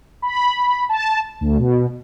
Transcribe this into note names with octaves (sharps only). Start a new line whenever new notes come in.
B5
A5
D2
B2